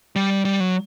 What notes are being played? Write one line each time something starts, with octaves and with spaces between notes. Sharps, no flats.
G3
G3
F#3